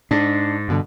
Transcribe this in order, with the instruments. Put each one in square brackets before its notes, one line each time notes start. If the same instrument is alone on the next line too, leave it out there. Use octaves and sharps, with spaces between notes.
[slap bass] G#2 [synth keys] D4
[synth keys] G2 B2 D3